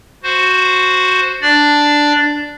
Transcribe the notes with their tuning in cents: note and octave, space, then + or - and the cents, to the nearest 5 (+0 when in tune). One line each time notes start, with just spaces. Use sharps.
F#4 +0 C5 +0
D4 +0 D5 +0